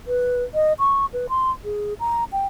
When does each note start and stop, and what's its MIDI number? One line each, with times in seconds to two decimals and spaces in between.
0.07 0.43 71
0.54 0.73 75
0.79 1.06 85
1.13 1.27 71
1.29 1.51 84
1.64 1.94 68
2.00 2.24 82
2.32 2.47 79